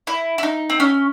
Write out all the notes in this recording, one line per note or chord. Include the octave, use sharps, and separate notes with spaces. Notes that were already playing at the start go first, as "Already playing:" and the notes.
E4
E4
D#4
C4
C#4